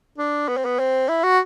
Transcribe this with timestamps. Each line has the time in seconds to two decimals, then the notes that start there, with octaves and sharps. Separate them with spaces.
0.18 D4
0.48 B3
0.57 C4
0.65 B3
0.79 C4
1.09 E4
1.23 F#4